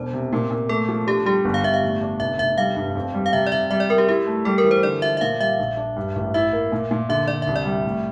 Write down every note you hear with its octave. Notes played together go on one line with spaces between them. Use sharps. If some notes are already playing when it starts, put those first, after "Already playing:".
Already playing: E1 D4 C5
C3
A#2
A#2
A3 A4
F3
D4 G4
G3 G4
G1
F5
G1 E5
F5
A2
D4
F1 E5
F1 E5
G3 F5
G2
F2
G3
F5
C3 E5
D5
C3 E5
G3 E5
D5
G3 A#4
G4
E4 G4
A3
G3 A4
A#4
E3
C5
D3 D5
F3 E5
E5
A#2 F5
G3 E5
A#1
D4
G2
A1
E4 E5
A#3
A#2
A#2
D3 E5
D3 D5
C2 E5
D5
G3
A2